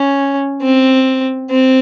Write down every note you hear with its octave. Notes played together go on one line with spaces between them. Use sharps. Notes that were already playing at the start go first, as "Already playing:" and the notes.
Already playing: C#4
C4
C4